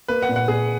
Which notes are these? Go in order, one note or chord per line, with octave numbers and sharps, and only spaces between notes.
A#3 B4
F#5
A#2
F#5
A#2 G#4